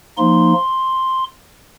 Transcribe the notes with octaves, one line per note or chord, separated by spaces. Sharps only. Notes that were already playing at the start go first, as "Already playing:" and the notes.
F3 A#3 D#4 C6